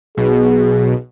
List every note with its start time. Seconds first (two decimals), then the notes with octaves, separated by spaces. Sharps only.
0.17 B1 B2 G#4